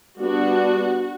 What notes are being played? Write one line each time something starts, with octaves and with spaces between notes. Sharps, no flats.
G3 B3 D4 F#4